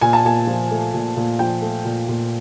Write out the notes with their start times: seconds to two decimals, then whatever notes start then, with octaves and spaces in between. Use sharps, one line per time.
0.01 A#2 G#5
0.13 A5
0.25 A#2 G#5
0.47 F3
0.71 A3
0.94 A#2
1.17 A#2
1.39 F3 G5
1.62 A3
1.85 A#2
2.09 A#2